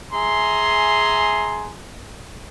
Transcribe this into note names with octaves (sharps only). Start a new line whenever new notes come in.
G#4 E5 G#5 A#5 C6